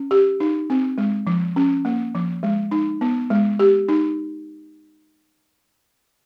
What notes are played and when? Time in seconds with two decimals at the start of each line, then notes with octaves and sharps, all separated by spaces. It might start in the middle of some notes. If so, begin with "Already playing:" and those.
Already playing: C#4
0.11 G4
0.40 D#4
0.70 C4
0.98 G#3
1.27 F3
1.56 C#4
1.85 A#3
2.15 F3
2.43 G#3
2.71 D#4
3.01 B3
3.30 G#3
3.59 G4
3.89 D#4